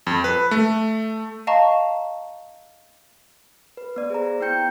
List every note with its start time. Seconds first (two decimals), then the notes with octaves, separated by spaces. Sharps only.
0.07 F2
0.24 B4
0.51 A3
1.47 D#5 F5 A5 A#5 C#6
3.77 B4
3.96 B3 D5
4.10 G#4 C5 A#5
4.41 B3 E4 G5 G6 C#7